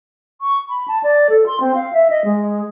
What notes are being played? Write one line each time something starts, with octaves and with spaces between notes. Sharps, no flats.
C#6
B5
A5
D5
A4
C6
C4
F5
E5
D#5
G#3